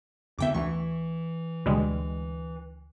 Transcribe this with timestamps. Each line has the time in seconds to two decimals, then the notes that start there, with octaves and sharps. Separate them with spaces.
0.39 F2 D3 B3 E5 G5 D6
0.54 D2 E3 C#6
1.66 D2 B2 D3 G3 G#3